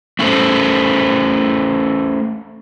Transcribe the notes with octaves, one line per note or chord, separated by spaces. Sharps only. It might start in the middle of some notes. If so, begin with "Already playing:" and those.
A3 C#4 A4 C5